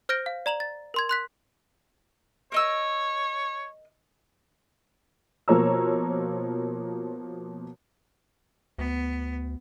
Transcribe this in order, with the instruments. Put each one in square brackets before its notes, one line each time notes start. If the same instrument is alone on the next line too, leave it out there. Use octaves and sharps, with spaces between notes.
[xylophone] C5 F6 G6 A#6 D7 G7
F5
D5 A#5 F7 F#7
A6
A#4 C6 G#6
C6 F#6 B6
[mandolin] A#4 D#5 E6 [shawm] C#5
[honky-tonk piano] B2 F3 A#3 C#5 A#5 E6
[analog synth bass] D2 [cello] B3